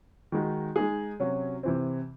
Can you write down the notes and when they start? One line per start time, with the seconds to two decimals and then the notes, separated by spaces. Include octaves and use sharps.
0.32 D#3 G#3 D#4 F#4
0.76 G#3 D#4 G#4
1.20 C3 F#3 C#4 F#4
1.63 C3 E3 C4